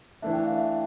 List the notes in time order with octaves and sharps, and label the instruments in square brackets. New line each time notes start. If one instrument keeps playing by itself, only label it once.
[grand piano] E3 A3 D4 [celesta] E5
[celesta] G5
F5
E5